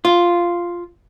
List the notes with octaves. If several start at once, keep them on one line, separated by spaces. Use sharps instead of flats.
F4